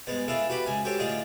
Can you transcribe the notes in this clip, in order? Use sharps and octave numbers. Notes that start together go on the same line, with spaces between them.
G2 G#3 B3 C5
D4 E4 G#4 A4 F5
F#4 G4 B4 F#5 B5 D6
G#2 C#3 G#5
F#4 G4 A4 C5 C#5 G5
A2 D3 D4 F4 G#4 D#5